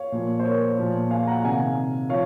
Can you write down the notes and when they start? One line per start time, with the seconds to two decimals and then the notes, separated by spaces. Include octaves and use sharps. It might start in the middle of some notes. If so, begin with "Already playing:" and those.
Already playing: C#5 F5
0.12 A#2 F3
0.40 C5
0.45 A#4 C#5
0.79 A#2 F3
1.11 F5 G#5
1.27 F#5 A#5
1.44 C3 D#3 F5 G#5
2.09 F3 C#5 F5